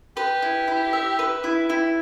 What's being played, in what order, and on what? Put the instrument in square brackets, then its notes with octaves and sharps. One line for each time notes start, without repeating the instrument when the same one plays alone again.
[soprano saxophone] G4 [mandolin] B4
[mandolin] E4
E4
E5
B4
E4
[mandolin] E4 [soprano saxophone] G4